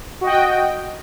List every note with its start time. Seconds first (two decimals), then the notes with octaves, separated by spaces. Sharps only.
0.21 F#4
0.24 D#5
0.26 G5